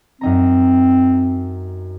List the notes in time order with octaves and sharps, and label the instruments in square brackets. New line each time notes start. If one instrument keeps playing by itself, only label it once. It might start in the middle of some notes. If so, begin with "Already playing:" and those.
[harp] F#2 D#4 A#5 [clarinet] C4